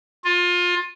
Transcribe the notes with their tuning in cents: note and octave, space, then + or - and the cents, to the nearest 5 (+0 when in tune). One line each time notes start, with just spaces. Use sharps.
F4 +25